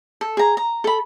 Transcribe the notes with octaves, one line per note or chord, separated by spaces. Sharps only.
A4
G#4 A#5
A#5
A4 B5